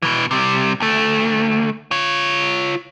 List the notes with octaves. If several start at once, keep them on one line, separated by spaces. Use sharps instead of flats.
B2 E3
C3 G3
D2 A3
F4 C#5